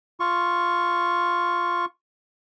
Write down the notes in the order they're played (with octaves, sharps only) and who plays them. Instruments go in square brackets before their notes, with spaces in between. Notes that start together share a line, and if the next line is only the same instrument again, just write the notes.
[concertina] F4 C#6